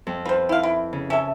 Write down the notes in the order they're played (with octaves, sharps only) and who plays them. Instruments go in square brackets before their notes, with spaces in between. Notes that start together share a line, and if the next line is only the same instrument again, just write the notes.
[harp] F2
[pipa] F4 C5 [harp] B4
[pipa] E4 F5
E4
[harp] C#3
[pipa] C#4 A4 [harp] E5